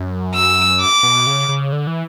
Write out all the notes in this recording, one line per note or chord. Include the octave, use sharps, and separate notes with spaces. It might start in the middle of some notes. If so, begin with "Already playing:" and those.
Already playing: F#2
E6
D6
B2
C#3
C#3
D3
E3